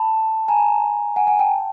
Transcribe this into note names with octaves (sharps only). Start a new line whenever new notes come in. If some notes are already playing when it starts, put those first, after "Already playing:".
Already playing: A5 B5
G#5 A#5
F#5 G#5
F#5 G#5
G5 A5